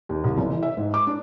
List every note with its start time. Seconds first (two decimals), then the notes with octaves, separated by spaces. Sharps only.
0.09 D#2
0.24 C2
0.38 F#1
0.50 E3
0.63 E5
0.77 G#2
0.94 D6
1.07 D4